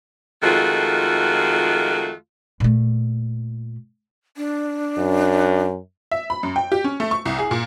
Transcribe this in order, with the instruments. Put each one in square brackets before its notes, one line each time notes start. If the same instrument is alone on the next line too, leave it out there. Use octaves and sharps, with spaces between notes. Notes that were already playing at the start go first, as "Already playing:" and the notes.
[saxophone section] F2 D#3 G#3 A3 F4 F#4
[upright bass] A#2 A3
[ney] D4
[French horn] F#2
[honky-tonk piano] E5
B5
F#2
G5
G4
C#4
A3
C#6
C2
G#4
A#2